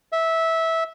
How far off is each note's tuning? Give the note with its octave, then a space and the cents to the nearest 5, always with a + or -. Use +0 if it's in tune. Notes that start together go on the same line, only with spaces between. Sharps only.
E5 -15